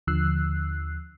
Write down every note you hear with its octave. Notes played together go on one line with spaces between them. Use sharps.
D#2 D3 F3 E6 F#6 C7